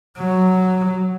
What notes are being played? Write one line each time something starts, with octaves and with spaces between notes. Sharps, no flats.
F#3